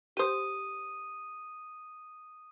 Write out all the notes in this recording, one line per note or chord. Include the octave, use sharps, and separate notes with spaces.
G4 C5 D#6 D#7